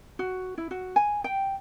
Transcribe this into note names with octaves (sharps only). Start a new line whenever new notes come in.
F#4
E4
F#4
G#5
G5